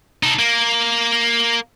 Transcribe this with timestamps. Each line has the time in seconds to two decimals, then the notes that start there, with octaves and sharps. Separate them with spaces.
0.23 D#4 A4
0.39 A#3